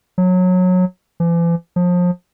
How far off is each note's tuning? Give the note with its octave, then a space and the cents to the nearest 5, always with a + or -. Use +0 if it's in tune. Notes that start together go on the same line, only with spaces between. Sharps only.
F#3 -20
E3 +45
F3 +30